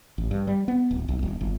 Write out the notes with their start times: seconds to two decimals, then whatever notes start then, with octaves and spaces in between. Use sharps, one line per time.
0.18 A1
0.31 G2
0.47 G3
0.68 B3
0.91 D1
1.08 B1
1.23 D#1
1.41 G1